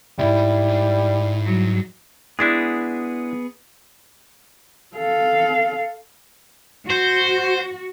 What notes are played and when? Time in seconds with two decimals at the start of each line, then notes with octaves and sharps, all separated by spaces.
0.19 C2 G#2 G3 E4
1.45 F#3 G3
2.39 G#3 B3 D4 E4 G#4
4.96 A4 F5
6.90 F#4 C5